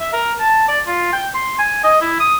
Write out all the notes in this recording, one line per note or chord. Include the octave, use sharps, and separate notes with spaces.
E5
A#4
A5
D5
F4
G5
C6
G#5
D#5
E4
D#6